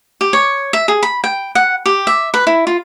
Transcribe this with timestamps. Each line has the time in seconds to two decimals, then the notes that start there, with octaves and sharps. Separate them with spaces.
0.21 G4
0.33 C#5
0.73 E5
0.88 G#4
1.03 B5
1.24 G5
1.55 F#5
1.86 G4
2.07 E5
2.34 B4
2.47 E4
2.67 F4